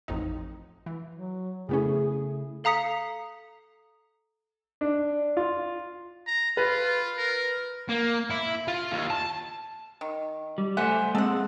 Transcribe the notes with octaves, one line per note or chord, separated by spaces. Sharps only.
A1 F2 D#4
E3
F#3
F2 C#3 A3 B3 C#4 E4 G#4
A4 F5 A#5 D#6 B6 C#7
D4
F4
A#5
F4 B4
A#4
A#3
E4
F4
D#2
A5
D#3
G3
A3 C5 E5 F#5 G#5
G#3 A#3 C4 A4 F#5